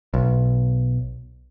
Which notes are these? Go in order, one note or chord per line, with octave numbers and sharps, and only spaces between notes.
B1